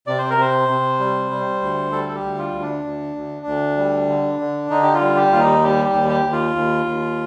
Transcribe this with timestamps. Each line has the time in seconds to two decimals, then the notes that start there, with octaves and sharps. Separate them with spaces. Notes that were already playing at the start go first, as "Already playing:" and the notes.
0.07 C3 D5
0.18 C5
0.30 A#4
0.38 C3 C5
0.69 C3
1.00 G3
1.31 G3
1.62 D2
1.92 G3 A4
2.08 A4
2.15 G4
2.23 D2
2.39 F4
2.54 D2
2.61 D4
2.85 D2
3.16 D2
3.46 D2
3.77 G3
4.08 D3
4.40 D3
4.70 D3 D#4
4.83 G4
4.93 F4
5.01 G3
5.17 G4
5.32 D#2 F4
5.39 D#4
5.63 G3 G4
5.85 G4
5.93 D#2
6.09 G4
6.25 D#2
6.32 F4
6.55 D#2
6.86 D#2